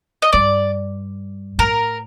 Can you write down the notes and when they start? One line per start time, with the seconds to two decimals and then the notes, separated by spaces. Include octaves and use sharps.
0.22 D#5
0.33 G2 D5
1.58 A2 A#4